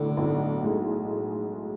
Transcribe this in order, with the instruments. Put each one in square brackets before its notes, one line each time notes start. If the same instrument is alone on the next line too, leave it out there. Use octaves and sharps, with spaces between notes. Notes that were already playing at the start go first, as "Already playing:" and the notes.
Already playing: [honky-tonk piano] B1 A2 [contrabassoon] D3
[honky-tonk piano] B1
A2 G#3